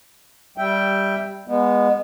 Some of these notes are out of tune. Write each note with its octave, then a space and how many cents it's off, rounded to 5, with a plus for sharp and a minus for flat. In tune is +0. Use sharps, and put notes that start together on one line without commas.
G3 +0 E5 +0 G5 +0
G#3 -25 B3 -15